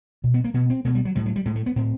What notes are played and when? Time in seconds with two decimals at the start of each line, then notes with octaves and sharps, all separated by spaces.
0.24 B2
0.34 B3
0.44 A#3
0.54 B2 B3
0.70 C4
0.85 B2 A3
0.95 G3
1.05 F#3
1.15 A2 G3
1.26 F#3
1.36 G3
1.46 A2 G#3
1.56 A3
1.66 B3
1.76 A2 C4